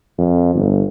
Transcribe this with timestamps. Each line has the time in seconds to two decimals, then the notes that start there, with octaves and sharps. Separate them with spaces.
0.18 F2
0.55 G1